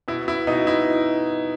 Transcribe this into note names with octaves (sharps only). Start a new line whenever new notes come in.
B2 E4
E4
B2 D#4
E4